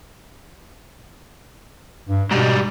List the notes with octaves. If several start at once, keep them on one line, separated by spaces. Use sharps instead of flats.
G2
G#2 B2 G3